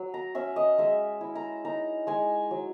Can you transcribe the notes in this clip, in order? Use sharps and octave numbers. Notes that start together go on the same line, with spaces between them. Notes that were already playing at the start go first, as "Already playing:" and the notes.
Already playing: F#3
A#5
C#4 E5
D#5
G#3 E5
E4
A#5
D#4 A#5
G#3 G#5
F#3